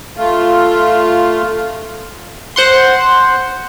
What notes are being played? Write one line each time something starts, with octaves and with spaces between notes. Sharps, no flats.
A3 F4
C5 F#5 C6